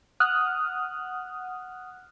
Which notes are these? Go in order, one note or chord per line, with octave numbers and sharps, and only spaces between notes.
F#5 D#6 F6 F#6